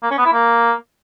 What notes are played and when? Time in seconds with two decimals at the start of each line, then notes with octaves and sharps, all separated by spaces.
0.03 A#3
0.11 C#4
0.18 B3
0.25 E4
0.33 A#3